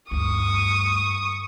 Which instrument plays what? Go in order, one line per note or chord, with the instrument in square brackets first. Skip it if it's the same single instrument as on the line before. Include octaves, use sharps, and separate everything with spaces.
[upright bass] D2 G2 [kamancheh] C#6 D#6